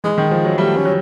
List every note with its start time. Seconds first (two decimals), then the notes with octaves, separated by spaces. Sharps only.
0.04 E3 G#3
0.18 D#3
0.31 F3
0.45 F#3
0.58 G3 A3
0.76 C#4
0.85 F#3